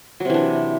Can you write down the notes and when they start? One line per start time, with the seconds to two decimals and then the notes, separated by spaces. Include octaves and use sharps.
0.20 F#3
0.25 C3
0.30 E3
0.34 D4